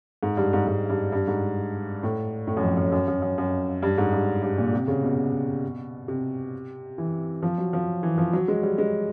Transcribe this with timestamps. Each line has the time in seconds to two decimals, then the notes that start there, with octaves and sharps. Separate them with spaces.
0.23 G#2
0.37 G2
0.53 G#2
0.67 G#2
0.90 G2
1.12 G2
1.28 G#2
2.03 A2
2.47 A2
2.57 F#2
2.63 F2
2.77 F#2
2.92 F#2
3.08 F#2
3.22 F#2
3.38 F#2
3.83 G2
3.98 G#2
4.13 G2
4.43 G2
4.58 A#2
4.73 C3
4.88 C#3
5.03 B2
6.08 C3
6.98 E3
7.43 F3
7.58 F#3
7.73 F3
8.03 E3
8.18 F3
8.33 F#3
8.48 G#3
8.63 G3
8.78 G#3